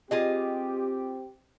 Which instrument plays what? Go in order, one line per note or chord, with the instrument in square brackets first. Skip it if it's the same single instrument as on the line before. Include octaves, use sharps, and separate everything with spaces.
[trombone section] C4 G4 [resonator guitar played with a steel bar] F4 G#4 D#5